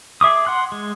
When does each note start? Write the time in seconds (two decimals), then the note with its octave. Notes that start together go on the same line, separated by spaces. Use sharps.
0.21 G#4 E5 D6 D#6
0.47 F#5 C6 F#6
0.72 G#3